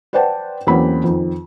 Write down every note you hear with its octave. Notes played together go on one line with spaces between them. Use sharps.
B4 C5 D5 F#5 G5 A5
E2 F#3 A#3 C4 C#4 B5
F2 D#3